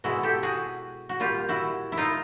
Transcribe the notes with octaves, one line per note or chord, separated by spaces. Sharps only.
B2 G#3 E4 F#4
G4 A4
F#4 G#4
F#4
A#2 G3 F4 G4
E4 F#4
E4
D#4 F4